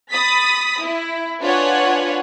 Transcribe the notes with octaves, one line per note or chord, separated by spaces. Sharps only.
B5 D#6 A6 B6
E4
D4 F4 B4 C#5 F#5 G#5